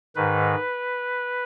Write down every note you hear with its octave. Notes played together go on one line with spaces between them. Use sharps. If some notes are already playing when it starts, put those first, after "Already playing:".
G#2 D#3 B4